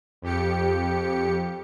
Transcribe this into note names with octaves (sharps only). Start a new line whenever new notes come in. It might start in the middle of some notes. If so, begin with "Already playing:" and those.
F2 G4 C#7